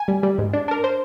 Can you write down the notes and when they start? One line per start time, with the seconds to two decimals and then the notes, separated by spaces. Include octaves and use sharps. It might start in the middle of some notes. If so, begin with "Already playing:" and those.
Already playing: G#5
0.08 G3
0.23 G3
0.38 G#2
0.53 D4
0.68 D4 A#4
0.84 C5